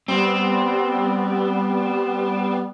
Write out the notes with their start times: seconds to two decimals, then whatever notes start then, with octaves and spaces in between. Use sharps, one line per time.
0.08 G3 B3 C4